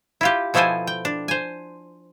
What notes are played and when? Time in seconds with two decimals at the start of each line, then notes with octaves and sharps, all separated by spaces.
0.21 E4 F4 G4
0.54 B2 F3 E4 A4 C5 G#5
0.87 G5
1.05 D4
1.28 C5 G#5